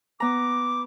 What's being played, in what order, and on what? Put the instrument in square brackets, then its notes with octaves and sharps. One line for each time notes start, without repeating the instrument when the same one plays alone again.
[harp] B3 A#5 [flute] D6